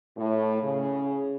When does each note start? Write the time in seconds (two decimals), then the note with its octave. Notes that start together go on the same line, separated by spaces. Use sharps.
0.17 A2
0.62 C#3